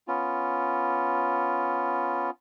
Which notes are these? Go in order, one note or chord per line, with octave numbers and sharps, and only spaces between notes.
B3 C#4 F4